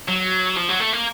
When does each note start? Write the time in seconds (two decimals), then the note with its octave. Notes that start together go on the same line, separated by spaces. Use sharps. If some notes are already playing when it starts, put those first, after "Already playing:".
0.09 F#3
0.57 F3
0.69 F#3
0.80 A3
0.93 A#3